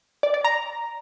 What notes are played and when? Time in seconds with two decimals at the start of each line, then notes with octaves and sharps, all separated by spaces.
0.23 D5
0.34 D5
0.44 A#5